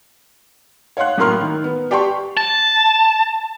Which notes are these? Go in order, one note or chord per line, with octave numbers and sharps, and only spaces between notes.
C#5 F5 F#5 C6 F#6
F#2 A2 A#3 A#4 C6 F6
D#3
B3
G4 D5 G5 A5 C6 C#6
A5